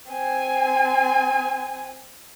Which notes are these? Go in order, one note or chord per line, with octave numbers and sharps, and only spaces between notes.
C4 G#5